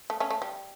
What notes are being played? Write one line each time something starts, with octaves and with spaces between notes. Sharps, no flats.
A3
A3 C#4
A3
G3